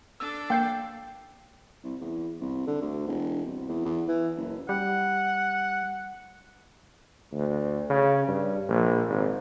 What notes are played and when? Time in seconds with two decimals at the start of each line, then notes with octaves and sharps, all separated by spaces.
0.20 D4 A4 E6
0.50 A#3 G5 G6 C7
1.84 C2
2.01 E2
2.41 C2
2.67 D3
2.82 D2
3.07 E1
3.46 C2
3.69 E2
3.85 E2
4.08 E3
4.36 F#1
4.69 G3 F#5
7.32 D2
7.90 C#3
8.28 G2
8.68 A#1
9.09 G#1